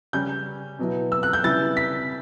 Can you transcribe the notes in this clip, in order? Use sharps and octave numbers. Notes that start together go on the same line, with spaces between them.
C#3 G3 C#4 G6
B2 F#3 B3 E4
E6
F#6
G6
C#3 G3 B3 E4 A6
B6